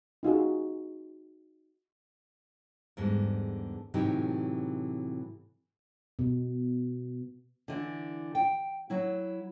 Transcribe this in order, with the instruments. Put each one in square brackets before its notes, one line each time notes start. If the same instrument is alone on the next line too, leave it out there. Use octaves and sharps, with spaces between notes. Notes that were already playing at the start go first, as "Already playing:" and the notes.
[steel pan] D#4 F4 F#4 G#4
[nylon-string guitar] E2 G#2 D3 G3
A2 C3 E3 F#3 D#4 G4
[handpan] B2
[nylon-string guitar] D3 E3
G5
F#3 E4